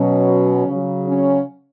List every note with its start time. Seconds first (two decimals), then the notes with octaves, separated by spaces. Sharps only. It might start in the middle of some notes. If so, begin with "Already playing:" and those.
Already playing: B2 F#3 C#4
0.66 C#3 F#3
1.06 C#4